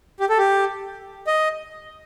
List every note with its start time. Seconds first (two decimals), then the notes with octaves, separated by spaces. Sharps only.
0.20 G4
0.29 A4
0.38 G4
1.27 D#5